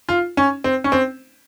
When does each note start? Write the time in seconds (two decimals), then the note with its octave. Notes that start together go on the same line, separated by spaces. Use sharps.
0.09 F4
0.37 C#4
0.64 C4
0.84 C#4
0.92 C4